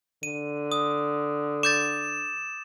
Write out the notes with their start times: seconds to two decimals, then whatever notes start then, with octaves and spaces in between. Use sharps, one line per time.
0.23 D3 D#7
0.72 D#6
1.63 D6 G6 A6 E7